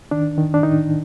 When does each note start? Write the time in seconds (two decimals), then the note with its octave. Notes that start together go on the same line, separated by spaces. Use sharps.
0.11 D#3 D4
0.38 D#3
0.54 D4
0.63 D#3 D#4